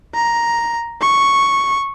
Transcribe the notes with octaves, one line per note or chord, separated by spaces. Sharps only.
A#5
C#6